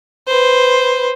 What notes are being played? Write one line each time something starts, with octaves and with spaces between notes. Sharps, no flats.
B4 C5